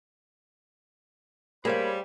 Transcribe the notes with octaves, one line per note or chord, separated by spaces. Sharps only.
G3 A#3 G#4 C5 C#5 F5 B5